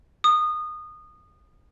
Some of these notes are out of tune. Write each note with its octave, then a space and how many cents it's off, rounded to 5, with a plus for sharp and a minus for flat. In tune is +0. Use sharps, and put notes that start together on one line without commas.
D#6 -20